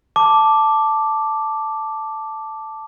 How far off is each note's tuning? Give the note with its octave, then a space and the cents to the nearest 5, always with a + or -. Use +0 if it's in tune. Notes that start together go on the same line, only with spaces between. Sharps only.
A5 +0 D6 +0